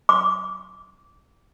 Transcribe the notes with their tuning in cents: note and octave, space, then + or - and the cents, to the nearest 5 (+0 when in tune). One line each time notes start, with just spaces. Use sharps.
D6 -20